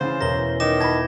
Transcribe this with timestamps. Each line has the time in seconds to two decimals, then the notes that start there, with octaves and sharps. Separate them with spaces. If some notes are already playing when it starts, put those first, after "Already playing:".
0.01 C#3 E3 C5 A6 C7 E7
0.21 E1 E2 C#4 A#4 A#6 G7
0.60 D#3 D6 A#6 E7
0.80 A5 B5 G#6 A#6